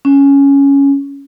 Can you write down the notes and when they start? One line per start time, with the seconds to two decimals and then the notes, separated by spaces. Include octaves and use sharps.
0.05 C#4